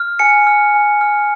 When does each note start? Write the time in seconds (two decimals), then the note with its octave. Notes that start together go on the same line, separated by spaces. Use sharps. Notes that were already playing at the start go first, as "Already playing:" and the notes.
Already playing: F6
0.19 G#5 C#7
0.47 F6
0.74 G#5
1.01 F6